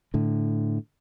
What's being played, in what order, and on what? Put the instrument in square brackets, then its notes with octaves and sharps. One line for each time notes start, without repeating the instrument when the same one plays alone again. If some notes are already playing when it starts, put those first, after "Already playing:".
[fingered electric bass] A2 D3